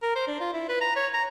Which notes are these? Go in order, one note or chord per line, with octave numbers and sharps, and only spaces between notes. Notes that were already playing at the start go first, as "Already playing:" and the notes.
A#4
C5
D4
F4
E4
B4
A#5
C#5
A#5